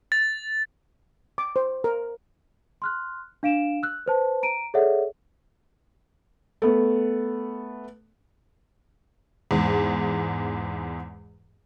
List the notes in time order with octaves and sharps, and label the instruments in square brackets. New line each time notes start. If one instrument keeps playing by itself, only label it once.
[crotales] A6
[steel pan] D6
C5
A#4
[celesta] C6 F6 F#6
D4 F5 D7 E7
E6 F#6
B4 C5 A5
A#5 D7 D#7
G#4 A4 C#5 D5 E5 F#5
[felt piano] A3 B3
[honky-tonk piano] E2 G#2